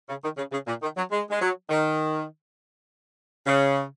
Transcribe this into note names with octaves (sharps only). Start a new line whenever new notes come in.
C#3
D#3
C#3
C#3
A#2
D#3
F#3
G#3
G#3
F#3
D#3
C#3